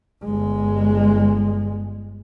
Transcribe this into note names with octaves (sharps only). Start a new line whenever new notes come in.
G1 G#3